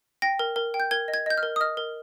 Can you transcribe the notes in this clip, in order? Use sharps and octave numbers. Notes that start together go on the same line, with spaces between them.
G5 A#6
A#4
A#4
G5
G6
A#4 G#6
D#5
G#6
D#5 G6
F6
A#4
D#6
D#5 F6
A#4